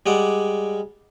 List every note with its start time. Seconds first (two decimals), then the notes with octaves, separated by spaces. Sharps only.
0.06 G3 G#3 D5 F#5